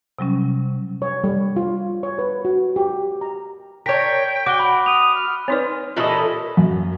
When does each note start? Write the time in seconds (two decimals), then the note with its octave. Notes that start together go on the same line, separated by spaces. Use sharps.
0.19 C3 F#3 G3 C#4
1.02 C#5
1.24 G3
1.56 F4
2.03 C#5
2.19 B4
2.45 F#4
2.76 G4
3.21 A#5
3.86 A#4 C#5 G5 B6
4.46 F#4 D6 F#6 G7
4.60 B5
4.86 D#6 F7
5.15 F6
5.48 C4 D#4 B4 C#5 D5
5.96 A#2 E3 F4 G4 A4 D#5 B5
6.57 F#2